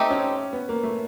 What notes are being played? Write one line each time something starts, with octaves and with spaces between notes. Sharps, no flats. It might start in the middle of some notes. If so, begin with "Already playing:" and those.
Already playing: A3 C4 D#4 G4
C#4
B3
A#3
A3